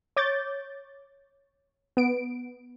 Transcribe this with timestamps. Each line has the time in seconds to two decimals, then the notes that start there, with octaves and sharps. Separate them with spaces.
0.16 C#5 D6 G6 A6
1.97 B3 D7